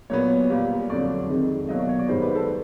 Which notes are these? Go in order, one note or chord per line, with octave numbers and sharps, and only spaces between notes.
A#2 F#3 B3 C#5
A#2 G3 A#3
F2 D3 F#3 D5
F2 C3 D#3 G#3
B2 F#3 A#3 D#5
D5
C#5
D5
G#2 D#3 G3 C5
B4
A4